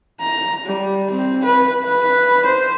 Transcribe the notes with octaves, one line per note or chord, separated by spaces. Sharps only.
A#5
G3
C4
B4
B4
C5